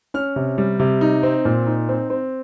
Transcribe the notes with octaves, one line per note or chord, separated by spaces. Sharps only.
C#4 F6
C3
G3
C3
D#4
C4
A#2
D#4
C4
C4